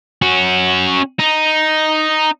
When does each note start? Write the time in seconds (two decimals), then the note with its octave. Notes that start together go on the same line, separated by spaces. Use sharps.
0.22 C#4 F#4
1.19 D#4